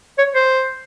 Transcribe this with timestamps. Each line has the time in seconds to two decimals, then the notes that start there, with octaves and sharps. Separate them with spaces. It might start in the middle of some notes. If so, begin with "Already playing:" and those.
0.18 C#5
0.35 C5